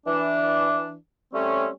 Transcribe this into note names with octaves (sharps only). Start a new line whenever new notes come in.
E3 D4
G3 A3 C4 C#4